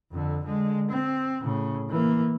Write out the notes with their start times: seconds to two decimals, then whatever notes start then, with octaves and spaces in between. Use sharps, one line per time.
0.11 F2 D3
0.44 D3 G#3
0.90 C4
1.42 A2 C#3
1.89 E3 A#3